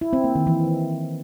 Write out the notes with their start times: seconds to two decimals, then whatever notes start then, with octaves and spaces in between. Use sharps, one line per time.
0.01 E4
0.13 C4
0.24 A#3
0.35 D#3
0.47 E3